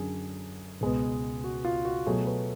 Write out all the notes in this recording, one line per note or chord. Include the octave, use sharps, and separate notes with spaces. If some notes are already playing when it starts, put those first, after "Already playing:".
Already playing: F#2 D3 F#3 G#4
C#2 B2 G#3 B3
F#4
F4
F#4
B2 F#3 A3 G#4
B4